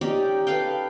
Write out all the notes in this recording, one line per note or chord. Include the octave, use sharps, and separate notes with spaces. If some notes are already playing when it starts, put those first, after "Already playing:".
C#4 D#4 G4 D5
A4 B4 F5 G5